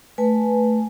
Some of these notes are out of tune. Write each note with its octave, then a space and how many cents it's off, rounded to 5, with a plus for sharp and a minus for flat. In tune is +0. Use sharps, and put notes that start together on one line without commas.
A3 +0 B4 +0 G#5 +0